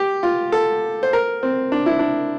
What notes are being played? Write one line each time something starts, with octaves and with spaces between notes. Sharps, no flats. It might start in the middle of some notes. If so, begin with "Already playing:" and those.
Already playing: G4
F4
A4
C5
A#4
C4
D4
E4
D4